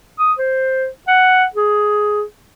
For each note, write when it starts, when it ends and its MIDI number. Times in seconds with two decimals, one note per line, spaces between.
0.19 0.32 87
0.38 0.87 72
1.07 1.44 78
1.55 2.22 68